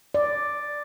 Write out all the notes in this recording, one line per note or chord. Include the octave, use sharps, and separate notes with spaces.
D5